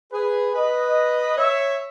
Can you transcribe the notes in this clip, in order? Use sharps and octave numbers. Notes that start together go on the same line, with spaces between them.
G#4 B4
B4 D#5
C#5 E5